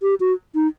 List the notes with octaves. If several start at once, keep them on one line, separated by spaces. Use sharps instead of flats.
G4
F#4
D#4